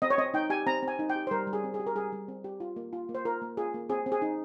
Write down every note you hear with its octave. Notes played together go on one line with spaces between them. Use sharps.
C4 D#5
C#5
C4 D#5
D#4 G5
G4 G#5
C4 A#5
C4
G#5
D#4
G5
G4
C5
G3 A#4
G3
G#4
C4
G#4
G4
A#4
G3 G#4
G3
C4
G4
F4
A#3
F4
A#3
C5
F4 A#4
A#3
F4 G#4
A#3
C4 G#4
C4
G#4
D#4